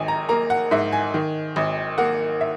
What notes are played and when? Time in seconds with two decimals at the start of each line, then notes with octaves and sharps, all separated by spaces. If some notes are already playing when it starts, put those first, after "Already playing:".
Already playing: G#1 D#3 G#5
0.08 A#5
0.29 A#3 A#5
0.50 F#5
0.71 G#2 E5
0.92 G#5
1.14 D#3
1.56 G#1
1.98 A#3 F#5
2.41 E5